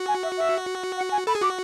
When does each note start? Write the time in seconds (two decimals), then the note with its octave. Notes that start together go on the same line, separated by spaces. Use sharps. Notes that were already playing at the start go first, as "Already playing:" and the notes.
Already playing: F#4
0.08 G#5
0.23 E5
0.37 E5
0.97 F#5
1.12 G#5
1.27 A4 B5
1.35 G#4
1.41 F#4 D6